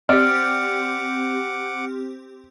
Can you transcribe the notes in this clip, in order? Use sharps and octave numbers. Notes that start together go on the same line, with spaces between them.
C4 G4 D5 F#5 D6 F6